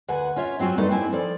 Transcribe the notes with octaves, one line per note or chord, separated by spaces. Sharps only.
D2 B4 F#5 G#5
C#4 F4 C#5 E5
F#3 C4 F4 F#4 G#5
G3 A3 D#4 A4 B4
G3 C4 E4 G#5
F3 A4 D5